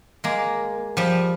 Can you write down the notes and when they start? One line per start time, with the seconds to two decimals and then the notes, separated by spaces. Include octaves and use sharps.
0.24 G#3 A#3
0.97 F3 G3